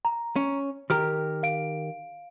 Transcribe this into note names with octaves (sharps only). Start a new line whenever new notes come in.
A#5
C#4
D#3 G4 A#4 F6
F5 D7